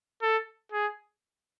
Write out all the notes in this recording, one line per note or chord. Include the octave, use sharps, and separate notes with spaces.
A4
G#4